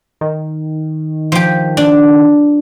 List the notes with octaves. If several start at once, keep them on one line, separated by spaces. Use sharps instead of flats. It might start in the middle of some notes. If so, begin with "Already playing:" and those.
D#3
F3 G4
D4